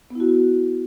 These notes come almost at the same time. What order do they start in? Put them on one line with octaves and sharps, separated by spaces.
B3 E4 F#4